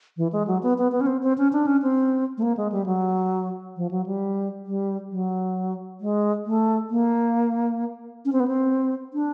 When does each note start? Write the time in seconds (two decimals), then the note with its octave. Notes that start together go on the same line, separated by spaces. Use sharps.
0.17 E3
0.33 G#3
0.47 F#3
0.63 B3
0.78 B3
0.92 B3
1.01 C#4
1.07 C4
1.23 C4
1.38 C#4
1.53 D4
1.67 C#4
1.83 C4
2.38 A3
2.42 A#3
2.57 G#3
2.72 G3
2.86 F#3
3.76 F3
3.91 F#3
4.06 G3
4.66 G3
5.11 F#3
6.01 G#3
6.46 A3
6.90 A#3
8.25 C#4
8.32 C4
8.40 B3
8.48 C4
9.14 D4